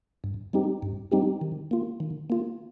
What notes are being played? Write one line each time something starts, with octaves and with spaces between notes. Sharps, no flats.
G2
G3 C4 D#4 G4
G2
G3 C4 D#4 G4
D#3
A#3 F4
D#3
A#3 F4